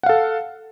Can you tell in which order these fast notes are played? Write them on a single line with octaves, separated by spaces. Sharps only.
F#5 F5 A4